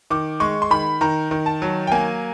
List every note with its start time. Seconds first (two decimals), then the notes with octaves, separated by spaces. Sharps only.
0.10 D#3 D6
0.40 G#3 C#6
0.62 C6
0.70 D#3 B5
1.01 D#3 A#5
1.31 D#3
1.46 A5
1.62 F#3
1.87 G5
1.92 A#3 G#5